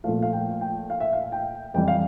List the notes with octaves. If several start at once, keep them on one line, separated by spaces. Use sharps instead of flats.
A#2 F3 A3 F5
F5
G5
G5
F5
E5
F5
G5
F2 E3 G3 G5
F5